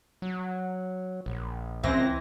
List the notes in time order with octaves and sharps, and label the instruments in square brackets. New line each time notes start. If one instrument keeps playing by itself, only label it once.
[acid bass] F#3
A#1
[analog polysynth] C#2 C4 A#6 [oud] E3